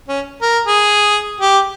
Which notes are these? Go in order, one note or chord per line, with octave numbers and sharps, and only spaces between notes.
C#4
A#4
G#4
G4